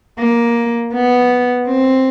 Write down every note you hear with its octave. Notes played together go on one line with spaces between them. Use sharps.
A#3
B3
C4